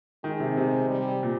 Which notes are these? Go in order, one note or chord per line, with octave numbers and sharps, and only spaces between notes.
D#3 G#3
C3
C3
G3
A#2